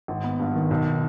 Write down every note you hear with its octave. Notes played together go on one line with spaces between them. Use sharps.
G#1
B3
G2
D#3
B1